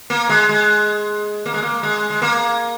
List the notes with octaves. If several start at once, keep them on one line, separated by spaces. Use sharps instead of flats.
A#3
G#3
G#3
A#3
G#3
A#3
G#3
G#3
A#3